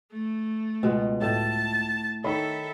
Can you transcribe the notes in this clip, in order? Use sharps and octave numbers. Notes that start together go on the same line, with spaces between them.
A3
C#2 B2 G#3
A2 A5
D#3 A4 C#5 E5 B5